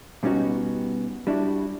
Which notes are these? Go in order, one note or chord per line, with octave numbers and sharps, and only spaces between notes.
B2 G3 B3 C#4 D#4 F#4
G3 D4 E4 F#4